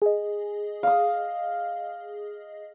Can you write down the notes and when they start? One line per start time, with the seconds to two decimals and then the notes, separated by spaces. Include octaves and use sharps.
0.02 G#4 D#5
0.83 F5 D#6